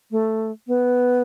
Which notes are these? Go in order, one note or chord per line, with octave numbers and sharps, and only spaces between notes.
A3
B3